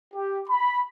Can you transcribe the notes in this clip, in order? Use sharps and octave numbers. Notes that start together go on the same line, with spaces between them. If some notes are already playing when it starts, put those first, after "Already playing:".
G4
B5